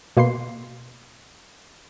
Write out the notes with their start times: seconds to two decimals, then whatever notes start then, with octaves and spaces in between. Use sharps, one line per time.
0.17 B2 A#3 B4 C6 C7